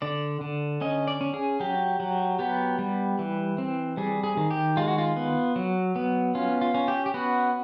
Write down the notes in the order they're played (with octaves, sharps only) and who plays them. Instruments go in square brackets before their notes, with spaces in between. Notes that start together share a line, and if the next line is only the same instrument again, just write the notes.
[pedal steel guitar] D3 D5
D3
C#4 D#5
D5
C#4
G#4
F#3 G4
F#3
B3 G4
G3
E3
C4
G3 G#4
G#4
D#3
G4
G#3 F4
F#4
F4
B3
F#3
B3
C#4 F4
F4
C#4
G4
G4
B3 F#4